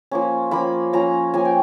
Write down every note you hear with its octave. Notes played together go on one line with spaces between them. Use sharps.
F3 A#3 C#4
F3 A#3 C#4 B5
F3 A#3 C#4 A#5
F3 A#3 C#4 G#5
G5